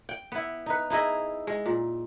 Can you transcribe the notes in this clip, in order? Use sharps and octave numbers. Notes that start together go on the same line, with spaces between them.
G5
B3 E4
D#4 B4
D#4 E4 G#4 D#5
G#3
A#2